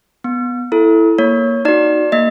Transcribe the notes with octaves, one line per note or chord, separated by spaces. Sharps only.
B3
E4 A4
A#3 C#5
D#4 F#4 D5
A#3 D#5